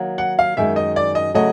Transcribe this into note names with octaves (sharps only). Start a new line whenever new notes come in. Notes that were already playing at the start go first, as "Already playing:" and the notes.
Already playing: D#3 F#3 A#3
F#5
F5
F#2 D#3 G#3 E5
D#5
D5
D#5
C#3 F#3 A3 D#5